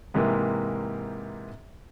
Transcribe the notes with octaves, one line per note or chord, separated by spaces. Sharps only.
G#2 C3 E3 A#3